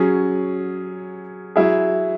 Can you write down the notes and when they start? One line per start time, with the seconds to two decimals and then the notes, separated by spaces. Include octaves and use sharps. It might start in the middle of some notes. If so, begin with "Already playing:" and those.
Already playing: F#3 C#4 G#4
1.56 F#3 E4 G#4